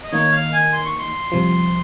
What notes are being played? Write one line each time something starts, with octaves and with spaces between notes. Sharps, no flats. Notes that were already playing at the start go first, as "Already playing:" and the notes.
D#5
D#3 A#3 D#4 C#5
F5
G#5
C6
C#6
C6
C2 C3 F3